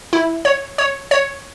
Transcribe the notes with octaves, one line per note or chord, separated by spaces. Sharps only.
E4
C#5
C#5
C#5